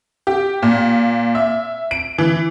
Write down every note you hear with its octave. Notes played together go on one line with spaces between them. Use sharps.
G4
A#2
E5
D7
E3